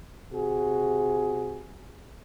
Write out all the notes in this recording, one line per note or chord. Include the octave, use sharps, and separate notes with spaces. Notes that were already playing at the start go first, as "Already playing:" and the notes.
C3 F#4 G#4